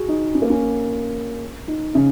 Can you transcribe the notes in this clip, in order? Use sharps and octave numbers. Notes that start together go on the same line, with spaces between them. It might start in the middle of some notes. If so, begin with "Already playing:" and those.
Already playing: F#4 G#4
D#4
C#4
A#3
C#4
D#4
C#3